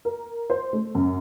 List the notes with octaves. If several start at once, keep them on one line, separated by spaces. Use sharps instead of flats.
A#4
C5
A3
F#2